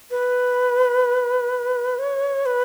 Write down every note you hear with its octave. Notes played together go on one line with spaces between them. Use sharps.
B4
C#5
B4